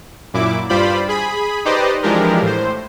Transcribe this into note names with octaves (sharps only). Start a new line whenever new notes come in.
F#2 A#2 E4 D6
G2 G3 F4 C5 D5 B5
G#4 B5
D#4 G4 B4 C5 D5 D#5
E3 F3 G#3 D4 G4 A#4
A2 C5